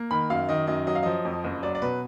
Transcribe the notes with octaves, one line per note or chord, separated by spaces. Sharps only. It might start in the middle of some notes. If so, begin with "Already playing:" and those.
Already playing: A#3
D#3 B5
F#2 F5
D#3 D#5
F#2 D#5
F#3 D#5
F5
F3 D#5
F2
F#1
F#3 D5
D5
B2 B4